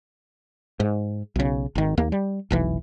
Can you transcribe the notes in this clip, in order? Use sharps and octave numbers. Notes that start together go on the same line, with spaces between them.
G#2
B1 C#3
G#1 D#3
D#2 A#3
G3
F1 B1 E3